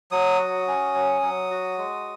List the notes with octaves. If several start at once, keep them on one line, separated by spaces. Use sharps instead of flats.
F#3 D#6
F#4
C#4
F#3
F#3
F#4
G#3